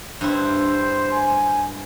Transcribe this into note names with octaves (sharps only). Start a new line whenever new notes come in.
G2 E4 C5
G#5